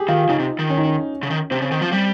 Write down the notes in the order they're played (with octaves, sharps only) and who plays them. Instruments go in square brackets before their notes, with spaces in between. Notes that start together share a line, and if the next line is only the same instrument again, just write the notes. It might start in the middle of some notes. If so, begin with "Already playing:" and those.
Already playing: [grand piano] G4 G#4
[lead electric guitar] D#3 [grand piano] F4
[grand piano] F4
[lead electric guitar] C#3 [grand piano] D#4
[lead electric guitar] C3
D#3
[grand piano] C#4
D#4
C#4
[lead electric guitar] C#3
D#3
[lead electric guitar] C3 [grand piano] C4
[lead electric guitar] C#3
D#3
F3
G3